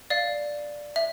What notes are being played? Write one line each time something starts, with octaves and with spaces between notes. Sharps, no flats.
D5 F5
E5